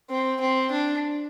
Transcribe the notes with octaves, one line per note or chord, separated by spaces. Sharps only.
C4
C4
D4